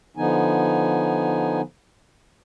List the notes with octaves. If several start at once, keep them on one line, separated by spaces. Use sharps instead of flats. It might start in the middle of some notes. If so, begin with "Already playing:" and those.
D3 F3 B3 D#4 G#5